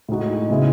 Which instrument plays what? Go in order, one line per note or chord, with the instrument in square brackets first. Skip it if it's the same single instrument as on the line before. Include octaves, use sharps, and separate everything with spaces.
[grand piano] A2 G#3 D#4 F#4
C#3 G#3 B3 E4